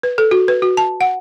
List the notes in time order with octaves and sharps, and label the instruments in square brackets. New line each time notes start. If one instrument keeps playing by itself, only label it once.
[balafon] B4
A4
F#4
B4
F#4
A5
F#5